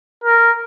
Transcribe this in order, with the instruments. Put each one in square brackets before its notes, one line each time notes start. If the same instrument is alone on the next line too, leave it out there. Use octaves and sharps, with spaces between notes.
[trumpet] A#4